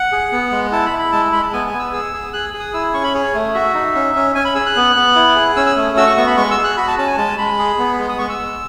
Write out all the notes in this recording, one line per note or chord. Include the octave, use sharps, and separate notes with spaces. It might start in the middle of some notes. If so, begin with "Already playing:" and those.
Already playing: F#5
G#4
B3
G#3
E4 A5
B5
E4
B5
G#3 A5
G#3 B5
A5
B3 G#5
G#5
B3
E6
G#4 E6
G#4
G#4 F#6
G#4
D#6
E4 E6
C#4 C#6
B5
G#4 C#5
A3
F#4 E5
D#4
C#4
C#4
C#4 G#5
B5
G#4 E6
F#6
B3
B3
E4
G#4
C#4 E6
E6
A3
F#4 E6
C#6
B3 C#6
B5
G#3 C#6
E6
G#4
F#6
F#4 B5
A5
C#4 A5
G#5
G#3 A5
G#3 B5
G#4
B3
G#3
D#6
G#3 C#6
E6
G#3